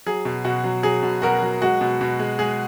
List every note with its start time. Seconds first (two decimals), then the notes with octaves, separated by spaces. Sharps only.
0.06 F#3 G#4
0.25 B2
0.45 B2 F#4
0.64 F#3
0.83 F#3 G#4
1.03 B2
1.22 B2 F#4 A#4
1.43 F#3
1.62 G#3 F#4
1.81 B2
2.01 B2
2.19 G#3
2.39 G#3 G#4